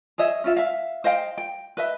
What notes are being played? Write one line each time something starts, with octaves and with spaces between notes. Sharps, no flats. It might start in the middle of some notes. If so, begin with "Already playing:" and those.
G#4 C#5 D#5 E5
C#4 F4 E5
E5 F5
C5 D#5 F5 G5
G5
B4 D#5 E5